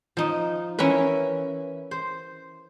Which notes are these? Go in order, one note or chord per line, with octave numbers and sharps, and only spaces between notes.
F3 D#4
E3 C#4 E4 A#4 B4
C5